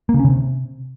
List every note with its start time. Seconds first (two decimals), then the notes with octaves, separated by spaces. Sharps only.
0.09 A#3
0.14 C#3
0.19 C#4
0.25 C#3
0.30 C3